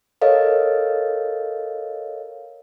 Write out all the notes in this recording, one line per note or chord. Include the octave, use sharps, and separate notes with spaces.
A4 A#4 C#5 D#5 F5